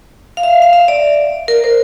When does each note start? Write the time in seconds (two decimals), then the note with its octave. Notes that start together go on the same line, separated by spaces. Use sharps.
0.37 F5
0.43 E5
0.62 F5
0.73 E5
0.88 D5
1.48 A#4
1.64 C5